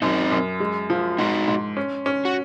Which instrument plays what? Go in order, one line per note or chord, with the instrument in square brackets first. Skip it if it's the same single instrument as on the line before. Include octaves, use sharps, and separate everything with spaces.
[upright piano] F#2 [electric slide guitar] C4 D#4
[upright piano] F#2
G#3
F3
[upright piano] G#2 [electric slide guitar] D#4 F#4
[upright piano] G#2
C#4
C#4
[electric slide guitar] F#4